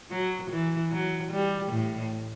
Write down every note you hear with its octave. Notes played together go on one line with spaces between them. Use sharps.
F#3
E3
F#3
G3
A2